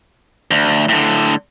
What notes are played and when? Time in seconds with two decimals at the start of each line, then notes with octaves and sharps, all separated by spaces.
0.51 D2
0.89 A2 D3